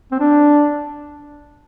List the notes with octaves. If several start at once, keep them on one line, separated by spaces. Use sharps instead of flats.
C4
D4